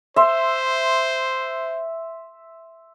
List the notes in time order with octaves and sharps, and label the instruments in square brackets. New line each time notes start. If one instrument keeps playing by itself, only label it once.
[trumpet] C5 [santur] E5 C6